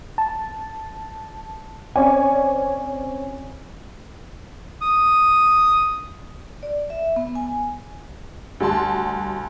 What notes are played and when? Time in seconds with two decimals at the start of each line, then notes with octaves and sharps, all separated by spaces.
0.18 A5
1.96 C4 C#4 C#5 D5 G#5
4.82 D#6
6.63 D5
6.90 E5
7.16 B3
7.35 G#5
8.60 D2 G3 F#4 A5 C6